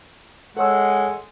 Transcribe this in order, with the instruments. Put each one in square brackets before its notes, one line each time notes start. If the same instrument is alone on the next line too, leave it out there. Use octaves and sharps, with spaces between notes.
[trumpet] G#3 [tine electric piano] A4 C#5 E6 [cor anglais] F#5